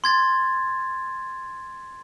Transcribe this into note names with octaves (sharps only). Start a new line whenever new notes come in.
C6 G#6 A6